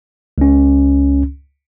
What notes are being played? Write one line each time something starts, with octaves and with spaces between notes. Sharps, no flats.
C#2 C#4